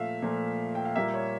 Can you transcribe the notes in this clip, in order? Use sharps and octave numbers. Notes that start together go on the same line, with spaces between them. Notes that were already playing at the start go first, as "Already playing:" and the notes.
Already playing: A#2 F3 A3 E5 F5
A#2 F3 A3
G5
F5
A#2 G3 A#3 E5
C#5